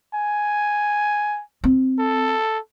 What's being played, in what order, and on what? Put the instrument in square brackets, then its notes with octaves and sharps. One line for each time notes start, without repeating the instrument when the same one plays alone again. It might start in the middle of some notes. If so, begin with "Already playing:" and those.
[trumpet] G#5
[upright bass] C4
[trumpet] A4